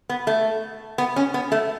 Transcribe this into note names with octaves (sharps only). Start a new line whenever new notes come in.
B3
A3
B3
C#4
B3
A3